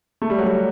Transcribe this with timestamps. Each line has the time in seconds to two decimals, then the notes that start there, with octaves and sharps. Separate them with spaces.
0.22 A3
0.30 G3
0.38 F#3
0.47 G3